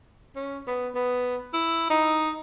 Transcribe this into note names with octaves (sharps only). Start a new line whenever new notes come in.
C#4
B3
B3
E4
D#4